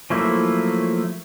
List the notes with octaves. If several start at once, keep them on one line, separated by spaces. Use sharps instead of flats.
F3 F#3 A3 A#3 E4